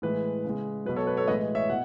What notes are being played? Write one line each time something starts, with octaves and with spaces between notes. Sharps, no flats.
A2 E3 G#3 B4
C#3
G#3
B2 F#3 B4
A4 C#5
B4
A4 C#5
A2 E3 G#3 B4 D#5
C#5 E5
B2 F#5